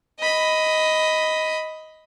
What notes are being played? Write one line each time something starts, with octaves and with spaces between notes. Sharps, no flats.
D#5 B5